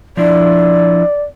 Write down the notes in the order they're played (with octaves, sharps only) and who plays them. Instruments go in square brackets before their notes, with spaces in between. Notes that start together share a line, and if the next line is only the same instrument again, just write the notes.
[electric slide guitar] F3 D4 E4 [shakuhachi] D5